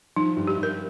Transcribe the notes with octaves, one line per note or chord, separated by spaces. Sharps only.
F3 D#4
G2
G4
G2
A#4